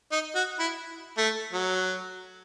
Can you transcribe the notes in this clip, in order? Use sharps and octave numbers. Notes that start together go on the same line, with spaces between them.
D#4
F#4
E4
A3
F#3